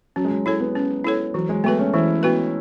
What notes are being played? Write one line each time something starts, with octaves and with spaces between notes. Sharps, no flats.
F#3 C#4
G#3
F#3
G#3 E4 A4 C#5
B3
C#4
E4 A4 C#5
E3 F#3
G#3
A3 B3 F#4 B4
C#4
E3 E4
B3 F#4 B4